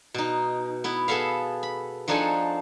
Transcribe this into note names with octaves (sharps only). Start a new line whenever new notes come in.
B2 D#4
B3 E4
B3 G#4 A4 E5 F5
B5
F3 D4 D#4 A4 F#5 G#5